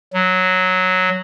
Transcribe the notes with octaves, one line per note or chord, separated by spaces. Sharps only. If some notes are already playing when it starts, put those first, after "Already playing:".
F#3